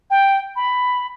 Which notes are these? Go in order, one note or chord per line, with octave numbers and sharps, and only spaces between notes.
G5
B5